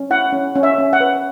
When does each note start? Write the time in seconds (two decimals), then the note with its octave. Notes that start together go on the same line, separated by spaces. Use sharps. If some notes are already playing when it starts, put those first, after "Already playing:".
Already playing: C#4
0.10 E4 F#5
0.32 C#4
0.55 C#4
0.63 E5
0.78 C#4
0.93 F#5
1.00 B4